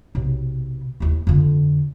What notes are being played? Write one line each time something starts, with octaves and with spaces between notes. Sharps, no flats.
B1 C3
D#2 E3
F2 D3